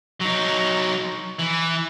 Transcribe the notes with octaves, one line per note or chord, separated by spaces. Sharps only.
F#3 D#4
E3